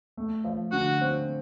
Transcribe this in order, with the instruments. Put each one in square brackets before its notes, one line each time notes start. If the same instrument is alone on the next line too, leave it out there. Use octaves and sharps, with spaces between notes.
[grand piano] A3
F3
[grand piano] D3 [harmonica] F#4
[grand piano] C4